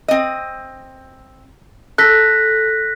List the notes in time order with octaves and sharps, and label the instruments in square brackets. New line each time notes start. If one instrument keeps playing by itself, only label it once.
[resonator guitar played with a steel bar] C4 D#5
[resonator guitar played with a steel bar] A4 [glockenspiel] F#6 A#6 B6